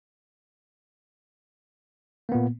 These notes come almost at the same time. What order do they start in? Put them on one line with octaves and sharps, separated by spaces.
A#3 B3 A#2